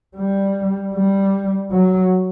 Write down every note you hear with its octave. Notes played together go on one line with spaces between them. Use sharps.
G3
G3
F#3